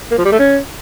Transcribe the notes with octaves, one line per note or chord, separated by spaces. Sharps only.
A#3
F3
G3
A3
C#4